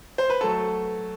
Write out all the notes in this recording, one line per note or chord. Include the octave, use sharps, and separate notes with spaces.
C5
B4
F#3 A3 A4